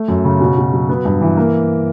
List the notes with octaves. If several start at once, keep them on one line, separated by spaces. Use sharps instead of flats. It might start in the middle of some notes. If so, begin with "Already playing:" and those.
Already playing: A3
F#2
C#3
B2
B2
F#3
B3
G2
E3
A#3